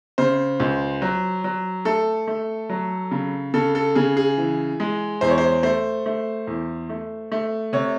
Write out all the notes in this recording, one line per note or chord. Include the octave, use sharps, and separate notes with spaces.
C#3 C5
C#2
F#3
F#3
A3 A4
A3
F#3
C#3
C#3 A4
A4
C#3 G#4
G#4
E3
G#3
E2 C5
C#5
C5
A3 C5
A3
E2
A3
A3
C3 C#5